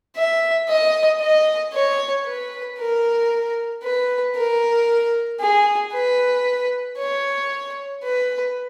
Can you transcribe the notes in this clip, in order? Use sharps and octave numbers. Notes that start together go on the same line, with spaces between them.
E5
D#5
D#5
C#5
B4
A#4
B4
A#4
G#4
B4
C#5
B4